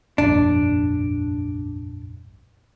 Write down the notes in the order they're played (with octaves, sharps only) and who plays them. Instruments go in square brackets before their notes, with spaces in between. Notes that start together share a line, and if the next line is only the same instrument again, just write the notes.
[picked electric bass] F1 A#1 G2 [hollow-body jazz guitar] D4